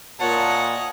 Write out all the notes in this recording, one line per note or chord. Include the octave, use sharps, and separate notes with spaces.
A#2 C#5 D#5 F#5 A5